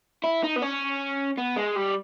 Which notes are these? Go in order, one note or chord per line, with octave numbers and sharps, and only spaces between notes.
E4
D#4
B3
C#4
B3
G#3
G3